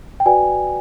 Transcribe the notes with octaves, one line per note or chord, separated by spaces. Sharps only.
G5
F#4 B4 D5 G#5